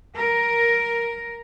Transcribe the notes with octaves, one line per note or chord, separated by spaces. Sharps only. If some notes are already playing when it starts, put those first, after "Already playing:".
A#4